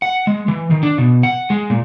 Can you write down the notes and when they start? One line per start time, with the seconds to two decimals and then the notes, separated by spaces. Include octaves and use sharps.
0.02 F#5
0.27 G#3
0.48 E3
0.71 D#3
0.83 D4
0.98 B2
1.23 F#5
1.50 G#3
1.70 A#2